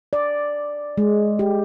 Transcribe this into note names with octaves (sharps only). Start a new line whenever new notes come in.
D5
G#3
G4